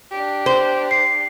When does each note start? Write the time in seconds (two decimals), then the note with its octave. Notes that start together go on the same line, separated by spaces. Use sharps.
0.12 D4 G4
0.46 C5
0.91 C7